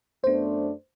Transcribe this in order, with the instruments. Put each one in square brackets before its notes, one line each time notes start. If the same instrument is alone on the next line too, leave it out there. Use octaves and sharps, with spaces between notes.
[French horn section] F#2 A3 D4 [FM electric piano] B3 C5